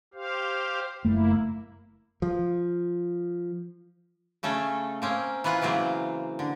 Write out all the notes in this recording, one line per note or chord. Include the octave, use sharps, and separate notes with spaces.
G4 C5 F5
F#1 A3 A#3 E4
F3
C#3 A3 C#4 A4
A#3 C4 C#4
E3 E4 F4 B4 F#5
C#3 E3 F#3 A#3 C4
D3